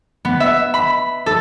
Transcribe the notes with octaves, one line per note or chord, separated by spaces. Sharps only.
B3
E5
B5
A4